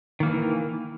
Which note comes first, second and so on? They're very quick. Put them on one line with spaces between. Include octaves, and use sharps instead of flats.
D#3 A#3 E3